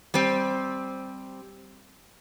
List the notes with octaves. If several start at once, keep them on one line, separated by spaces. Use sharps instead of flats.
G3 C4